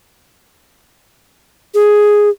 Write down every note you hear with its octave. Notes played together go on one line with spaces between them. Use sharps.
G#4